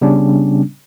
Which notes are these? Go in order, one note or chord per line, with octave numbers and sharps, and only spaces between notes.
C#3 G3 B3 C#4 D4